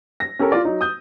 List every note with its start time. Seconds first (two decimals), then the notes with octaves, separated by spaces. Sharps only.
0.20 A#6
0.39 C#4 G4 A4 A#4
0.52 F4 D5
0.65 F#3 D#4
0.81 D#6 G6